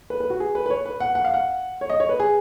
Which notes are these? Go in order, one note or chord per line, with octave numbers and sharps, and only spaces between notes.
B4
B4
F#4
G#4
B4
B4
C#5
B4
F#5
F#5
F5
F#5
C#5
D#5
C#5
B4
G#4